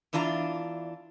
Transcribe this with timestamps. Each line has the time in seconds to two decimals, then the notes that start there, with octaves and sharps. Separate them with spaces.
0.13 E2 E3 D4 F4 A#5